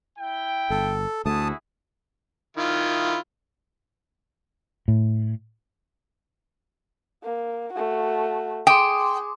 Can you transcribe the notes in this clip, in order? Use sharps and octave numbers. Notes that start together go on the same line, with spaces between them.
E4 G5
G1 A4
D2 A3 E4 F#4 G#4 A5 D#6
D#3 E4 F4
A2
A#3
A3 F#4
G#4 G5 C6 D6 D#6